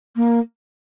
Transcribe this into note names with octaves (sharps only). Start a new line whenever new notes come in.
A#3